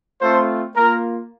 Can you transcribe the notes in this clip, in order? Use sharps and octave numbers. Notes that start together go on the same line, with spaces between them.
A3 C4 F4 A4 C5
A#3 F4 A#4